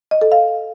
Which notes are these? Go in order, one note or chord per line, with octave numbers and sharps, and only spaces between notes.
D#5
A4
F5